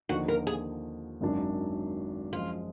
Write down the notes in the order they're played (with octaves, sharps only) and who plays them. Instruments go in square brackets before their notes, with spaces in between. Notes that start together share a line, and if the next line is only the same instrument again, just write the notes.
[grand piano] D#2 D3 F3 A#3 D#4 [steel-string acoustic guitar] F#4
[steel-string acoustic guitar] A#4
G#4
[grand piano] G#1 F#2 D#3 F#3 D4
[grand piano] F#2 F3 G#3 [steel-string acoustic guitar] F4